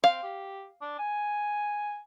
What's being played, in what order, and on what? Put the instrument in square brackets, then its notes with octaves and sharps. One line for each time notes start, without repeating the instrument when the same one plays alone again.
[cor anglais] C4 [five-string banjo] F5
[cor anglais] G4
D4
G#5